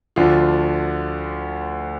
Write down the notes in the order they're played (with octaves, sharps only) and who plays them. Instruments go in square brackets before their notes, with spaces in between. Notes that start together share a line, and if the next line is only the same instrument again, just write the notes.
[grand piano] D2 D3 F3 F4